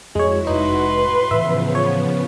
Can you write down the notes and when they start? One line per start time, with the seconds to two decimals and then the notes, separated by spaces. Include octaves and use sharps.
0.15 F2 G#3 E4 F#4 C#5
0.47 F1 F2 G#3 D#4 B4 C6
0.96 A2
1.31 A2 C#3 E3 F3 B3 E5
1.75 C#5